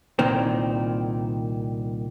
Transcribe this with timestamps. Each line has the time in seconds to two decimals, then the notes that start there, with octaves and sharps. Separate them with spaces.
0.19 C2 A#2 D#3 C4